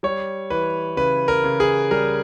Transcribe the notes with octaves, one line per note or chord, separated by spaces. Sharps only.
G3 C#5
E3 B4
C#3 B4
A#4
C#3
G#4
G3 A#4